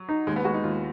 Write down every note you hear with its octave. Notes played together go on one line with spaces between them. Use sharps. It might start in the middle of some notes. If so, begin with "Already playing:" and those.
Already playing: F#3
D#4
D#2 G#3
B3
G#3 F#4
D#4
D#2 F4